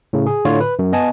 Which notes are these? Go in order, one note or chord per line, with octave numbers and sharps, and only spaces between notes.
A2 C#3
G#4
A2 D3 F4 C#5
B4
F#2
B3 D#5 G#5 A5